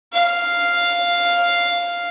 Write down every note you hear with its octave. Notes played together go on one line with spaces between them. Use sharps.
F5